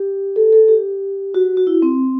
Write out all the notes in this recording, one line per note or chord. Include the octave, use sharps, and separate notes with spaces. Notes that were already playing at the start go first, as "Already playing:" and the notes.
Already playing: G4
A4
A4
G4
F#4
F#4
E4
C4